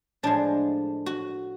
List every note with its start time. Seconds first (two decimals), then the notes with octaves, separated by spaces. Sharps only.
0.23 A2 F3 G#3 D4
1.06 F#4